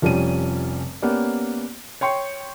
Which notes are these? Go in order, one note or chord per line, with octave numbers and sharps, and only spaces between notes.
F1 F3 G3 C#4 D#7
A#3 B3 C#4 G4 D5
C#5 G5 C6 C#6 C#7